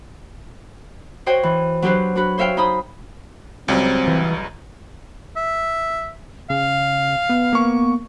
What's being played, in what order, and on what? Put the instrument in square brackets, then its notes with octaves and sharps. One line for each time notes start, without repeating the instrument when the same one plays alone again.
[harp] F#4 C5 C#5 D#5 G5
E3
F#3 D4 G4 B4 C5
D4 F#4 B4
C5 C#5 E5 F5 G5
D#4 C5 B5 D#6
[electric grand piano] C#2 F#3 G3 [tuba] C4
[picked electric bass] E3
[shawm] E5
[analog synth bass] C#3 [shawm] F5
[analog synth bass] B3
[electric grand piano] A#3 C#6